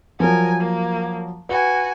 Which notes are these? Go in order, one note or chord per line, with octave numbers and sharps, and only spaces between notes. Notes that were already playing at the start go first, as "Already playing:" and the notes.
F3 F#3 A#4 G#5
A#3
F#4 B4 G#5